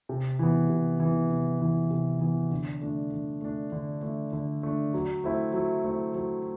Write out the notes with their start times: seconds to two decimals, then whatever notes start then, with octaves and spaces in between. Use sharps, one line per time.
0.09 C3
0.39 E3 B3
0.69 C3
1.00 E3
1.05 B3
1.30 C3
1.60 E3 B3
1.91 C3
2.21 E3 B3
2.51 D3
2.82 A3 D4
3.12 D3
3.42 A3 D4
3.72 D3
4.03 A3 D4
4.33 D3
4.63 A3 D4
4.94 F#3
5.24 A3 C4 E4
5.54 F#3
5.84 A3 C4 E4
6.15 F#3